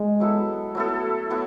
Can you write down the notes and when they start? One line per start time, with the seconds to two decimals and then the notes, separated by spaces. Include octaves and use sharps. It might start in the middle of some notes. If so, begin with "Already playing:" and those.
Already playing: G#3
0.20 F#3 B3 E4 A4
0.75 F#3 A3 B3 E4 A4
1.30 F#3 B3 E4